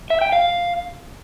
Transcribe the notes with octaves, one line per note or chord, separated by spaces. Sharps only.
E5
G5
F5